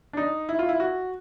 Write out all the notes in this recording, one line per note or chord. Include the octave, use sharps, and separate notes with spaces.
D4
D#4
E4
F4
E4
F#4